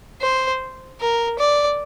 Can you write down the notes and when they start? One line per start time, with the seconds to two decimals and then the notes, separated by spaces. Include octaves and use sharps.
0.21 C5
1.00 A#4
1.39 D5